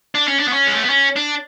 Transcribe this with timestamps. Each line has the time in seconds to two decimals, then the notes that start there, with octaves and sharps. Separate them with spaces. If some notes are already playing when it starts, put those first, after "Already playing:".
0.15 D4
0.28 C#4
0.40 D4
0.48 B3
0.53 C#4
0.67 G#3
0.75 A3
0.83 B3
0.90 C#4
1.16 D4